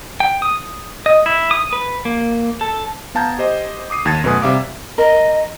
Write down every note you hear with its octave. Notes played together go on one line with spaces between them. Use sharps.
G5
D#6
D#5
E4
D#6
B4
A#3
A4
B3 F5 A5 A#5 G6 G#6
G4 C5 D#5
D6 D#6 C7 D#7
D#2 A5 G#6 A6 C#7
F#2 B2 A3 B4 G#5 D#6
C3 G3 E5 F5 D6
A#4 D#5